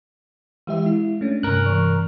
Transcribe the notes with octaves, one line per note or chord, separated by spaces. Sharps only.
E3 G#3 G4 E5
E4
A3 C#4 D4
G2 C3 A#4 F#6
E3